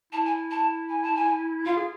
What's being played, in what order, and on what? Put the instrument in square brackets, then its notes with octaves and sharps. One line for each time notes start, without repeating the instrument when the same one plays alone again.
[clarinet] E4 [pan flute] A5
[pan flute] G#5
A5
G#5
A5
G#5
[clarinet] F4 [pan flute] F5
[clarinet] G#4